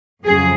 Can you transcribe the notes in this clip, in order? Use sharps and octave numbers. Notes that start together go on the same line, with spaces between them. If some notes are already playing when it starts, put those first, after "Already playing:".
F2 C#3 F#3 G#4